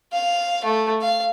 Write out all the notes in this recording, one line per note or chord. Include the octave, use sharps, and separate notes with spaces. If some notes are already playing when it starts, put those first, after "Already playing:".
F5
A3
F5